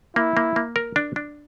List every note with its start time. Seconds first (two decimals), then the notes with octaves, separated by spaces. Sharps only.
0.16 A#3 E4
0.37 A#3
0.56 A#3
0.76 A#4
0.96 D4
1.16 D4